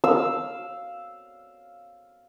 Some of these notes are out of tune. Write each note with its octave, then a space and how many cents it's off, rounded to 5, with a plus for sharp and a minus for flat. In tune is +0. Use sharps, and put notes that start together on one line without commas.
F5 +0 E6 +0